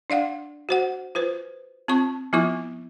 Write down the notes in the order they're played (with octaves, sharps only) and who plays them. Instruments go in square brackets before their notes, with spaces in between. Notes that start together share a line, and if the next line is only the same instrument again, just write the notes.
[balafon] D4 D5 F5 F#5
F#4 C5 F#5
F4 B4 C5
C4 F4 A5 C#6
F3 B3 E4 F4 C#6